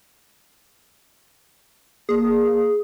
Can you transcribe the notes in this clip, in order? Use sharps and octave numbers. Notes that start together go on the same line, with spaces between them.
A#3 G#4